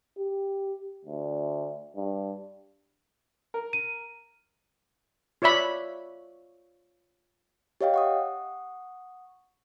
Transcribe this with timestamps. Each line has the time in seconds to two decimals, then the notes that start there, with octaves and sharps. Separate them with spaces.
0.18 G4
1.05 D2
1.96 G2
3.54 A#4
3.73 D#7
5.42 F4 C#5 D5 E5 B5
7.81 G4 C#5 D#5 F5 G5
7.94 F#5 C#6 D#6